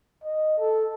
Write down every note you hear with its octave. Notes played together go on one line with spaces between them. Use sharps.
D#5
A4